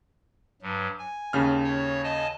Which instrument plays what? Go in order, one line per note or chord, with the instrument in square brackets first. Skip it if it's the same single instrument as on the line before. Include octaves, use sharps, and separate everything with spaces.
[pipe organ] G2 F#3
G#5
[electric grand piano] D#2 C#3 F6
[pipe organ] C#5
D#5 G#5 A5